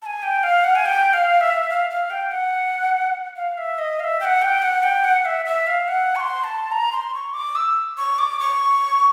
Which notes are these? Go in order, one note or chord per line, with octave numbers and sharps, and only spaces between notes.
A5
G#5
G5
F5
F#5
G#5
G5
F5
E5
F5
F5
G5
F#5
F5
E5
D#5
F5
E5
G5
F#5
G5
F#5
G5
F#5
E5
E5
F5
F#5
C#6
C6
A5
A#5
C6
C#6
D6
E6
C#6
D6
C#6